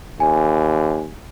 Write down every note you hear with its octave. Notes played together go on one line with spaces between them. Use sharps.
D#2 G#5